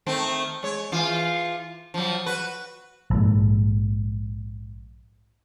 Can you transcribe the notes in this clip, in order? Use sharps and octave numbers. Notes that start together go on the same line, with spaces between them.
D#3 A3 C4
G#3 C#5
E3 F4
F3 F#3
F#4 B4
A#1 G#2